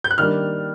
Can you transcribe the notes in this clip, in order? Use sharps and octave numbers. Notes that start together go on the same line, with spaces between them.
G6
F#6
D#3 G3 A#3 D4 F6